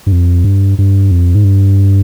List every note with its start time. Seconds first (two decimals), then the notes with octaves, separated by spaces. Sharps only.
0.06 G2
0.12 F2
0.44 G2
0.78 G2
1.11 F2
1.35 G#2
1.44 G2